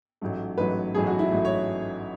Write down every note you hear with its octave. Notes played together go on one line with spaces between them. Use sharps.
A1 G#2 F#3 A3
A1 G#2 F#3 A3 B4
A1 G#2 F#3 A3 G#4
F#4
E4
A1 G#2 F#3 A3
C#5